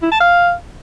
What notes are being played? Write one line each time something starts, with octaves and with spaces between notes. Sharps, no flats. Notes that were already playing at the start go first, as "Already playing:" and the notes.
E4
A5
F5